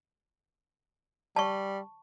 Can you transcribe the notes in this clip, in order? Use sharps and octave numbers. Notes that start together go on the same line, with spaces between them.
G3 A5 C#6